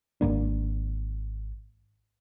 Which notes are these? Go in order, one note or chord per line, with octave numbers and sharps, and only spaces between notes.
G#1 F#2 A#3 D4